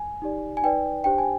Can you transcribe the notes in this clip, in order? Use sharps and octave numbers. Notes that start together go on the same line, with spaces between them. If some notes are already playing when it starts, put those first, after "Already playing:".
Already playing: G#5
D#4 G4 D5
G#5
D#4 B4 D5 G5
D4 G4 C5 G5
G#5